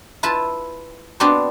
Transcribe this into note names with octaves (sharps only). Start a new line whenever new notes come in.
E4 F4 B4 A5
B3 C4 D4 F#4 G4 C5